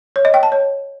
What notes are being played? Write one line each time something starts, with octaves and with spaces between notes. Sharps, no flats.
C#5
D#5
G5
A5
C#5